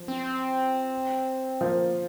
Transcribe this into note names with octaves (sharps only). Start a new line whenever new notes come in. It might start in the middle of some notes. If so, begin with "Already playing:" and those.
Already playing: F3
C4
F3 A#3